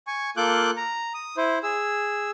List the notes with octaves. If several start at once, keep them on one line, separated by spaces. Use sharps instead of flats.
G#5 C#6
A#3 F4 A4 D6 F#6 G6
A#5
D#6
E4 C5
G#4 E6